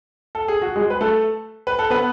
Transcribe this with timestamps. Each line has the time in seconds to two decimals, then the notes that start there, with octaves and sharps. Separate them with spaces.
0.35 A4
0.48 G#4
0.62 F#4
0.76 G#3 G#4
0.90 B4
1.01 A3 A4
1.67 B4
1.79 A4
1.90 B3 B4